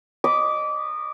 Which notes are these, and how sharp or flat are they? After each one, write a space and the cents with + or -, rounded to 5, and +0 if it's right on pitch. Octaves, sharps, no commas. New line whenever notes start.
D#5 -25 B5 +0 D6 -20